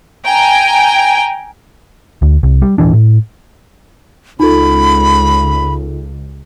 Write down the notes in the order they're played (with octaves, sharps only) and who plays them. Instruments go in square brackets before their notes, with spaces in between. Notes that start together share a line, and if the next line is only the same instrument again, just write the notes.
[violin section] G5 G#5 A#5
[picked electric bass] D2
C2
G3
D#1 A1 E3 D4
A2
[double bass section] C#2 [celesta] D#4 F4 A4 [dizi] B5